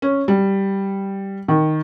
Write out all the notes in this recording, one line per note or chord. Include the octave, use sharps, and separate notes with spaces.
C#4
G3
D#3